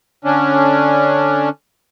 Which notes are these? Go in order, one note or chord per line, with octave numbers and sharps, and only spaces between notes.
D3 C#4 D4